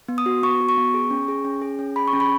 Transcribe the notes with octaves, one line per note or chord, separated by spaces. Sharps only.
B3
D#6
F#4
B3 C#6
F#4
C#6
B3
G#4
C#4
G#4
C#4
G#4
C#4
G#4 B5
C#6
C#4
B5